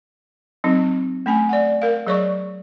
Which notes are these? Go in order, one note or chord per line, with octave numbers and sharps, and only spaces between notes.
F#3 C4 D#4
A3 C#4 G#5
D5 F#5
A#4 F5
F#3 G#4 C#5 D5 C#6